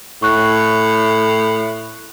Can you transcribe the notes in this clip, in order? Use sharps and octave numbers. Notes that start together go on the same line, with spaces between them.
A2 C#6 F#6